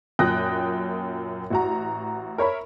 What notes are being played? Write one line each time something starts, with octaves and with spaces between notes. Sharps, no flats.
F#2 A#2 G5 D#6 F#6 A#6
A1 F#4 A#5
A#4 C#5 E5 B5